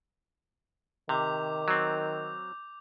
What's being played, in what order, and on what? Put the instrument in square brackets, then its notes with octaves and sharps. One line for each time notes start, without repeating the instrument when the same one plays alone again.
[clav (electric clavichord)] C3 [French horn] D#3 [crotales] D6 G6 F7
[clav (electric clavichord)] F#3 C4